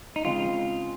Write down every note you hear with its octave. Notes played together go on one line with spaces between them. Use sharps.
D#4
C#3 G#3 C4 F4